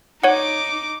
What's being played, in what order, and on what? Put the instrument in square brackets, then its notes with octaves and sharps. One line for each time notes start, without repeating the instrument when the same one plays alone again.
[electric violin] D#4 D6 [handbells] C#5 F#5